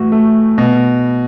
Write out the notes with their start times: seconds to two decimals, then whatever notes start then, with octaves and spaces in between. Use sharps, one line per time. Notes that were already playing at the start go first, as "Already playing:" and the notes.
Already playing: A2 E3 F#4
0.12 A3
0.58 B2